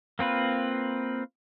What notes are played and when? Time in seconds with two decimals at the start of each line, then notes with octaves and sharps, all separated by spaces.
0.19 A#3 C4 F4 B4